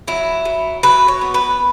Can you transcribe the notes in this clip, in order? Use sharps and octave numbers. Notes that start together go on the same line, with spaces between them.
F#3 E4
F#3
F#3 B4
C#5
B3
B4